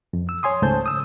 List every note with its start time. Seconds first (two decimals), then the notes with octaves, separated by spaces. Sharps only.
0.13 F2
0.29 E6
0.43 C#5 G#5 C6 D#6
0.62 C#2 G#2 A3 C5 A5 G6
0.86 D#6 E6